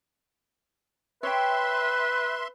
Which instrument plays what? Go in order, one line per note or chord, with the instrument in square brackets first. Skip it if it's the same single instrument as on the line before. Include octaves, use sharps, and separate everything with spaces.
[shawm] B4 [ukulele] C#5 G5 [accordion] E5 C6